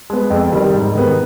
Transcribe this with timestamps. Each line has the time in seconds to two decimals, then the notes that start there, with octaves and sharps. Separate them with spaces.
0.10 G#3 B3
0.30 F2
0.52 D#3 G3
0.74 G#2
0.95 D#3 B3